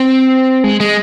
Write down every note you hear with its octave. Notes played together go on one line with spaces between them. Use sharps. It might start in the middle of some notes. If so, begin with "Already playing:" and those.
Already playing: C4
G#3
G#3